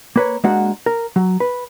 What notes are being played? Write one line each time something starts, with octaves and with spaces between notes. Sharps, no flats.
A#3 B4 C#5
G#3 A#3 D4 F#4 F#5
A#4
F#3
B4